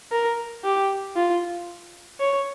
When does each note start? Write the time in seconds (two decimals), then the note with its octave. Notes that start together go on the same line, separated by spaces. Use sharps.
0.12 A#4
0.64 G4
1.16 F4
2.20 C#5